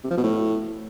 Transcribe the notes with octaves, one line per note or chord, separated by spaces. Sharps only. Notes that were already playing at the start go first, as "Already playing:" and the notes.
C3
F3
B2
A2